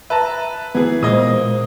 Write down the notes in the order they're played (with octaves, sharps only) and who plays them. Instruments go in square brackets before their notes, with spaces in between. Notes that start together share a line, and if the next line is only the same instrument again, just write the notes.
[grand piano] B4 A5 [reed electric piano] E5 A#5
[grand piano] E3 G#4 [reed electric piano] B3
[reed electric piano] A#2 G#3 C5 [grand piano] A#3 D#5 D#6